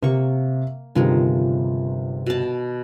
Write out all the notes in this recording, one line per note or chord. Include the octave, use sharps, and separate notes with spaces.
C3 A#3 C#6
G1 C3 D#3 F3 G#3 A#4
B2 A5